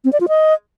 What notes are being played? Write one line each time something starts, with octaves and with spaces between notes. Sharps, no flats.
C4
D5
F4
D#5